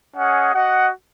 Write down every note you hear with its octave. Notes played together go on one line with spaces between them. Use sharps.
C#4 G#4 D#5 F#5
F#4 D#5 F#5